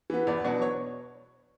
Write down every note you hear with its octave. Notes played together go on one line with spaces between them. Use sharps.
E3 B3
E2 D5
B2 F#3 B3 D4
C#5